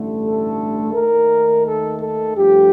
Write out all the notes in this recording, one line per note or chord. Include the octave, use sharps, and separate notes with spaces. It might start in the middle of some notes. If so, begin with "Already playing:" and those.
Already playing: A1 G2 D3 A3
A4
D#2 D#3 A3 A#4
A4
A4
G2 F3 A3 G4